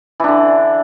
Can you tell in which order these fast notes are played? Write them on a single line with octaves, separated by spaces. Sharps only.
E3 D4 D3